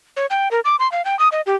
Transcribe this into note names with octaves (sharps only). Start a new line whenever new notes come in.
C#5
G5
A#4
D6
C6
F5
G5
D#6
D#5
G4